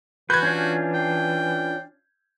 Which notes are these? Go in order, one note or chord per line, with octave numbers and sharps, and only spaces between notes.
E3 F#4 B4 G6 G#6
C#4 D4 F4
G5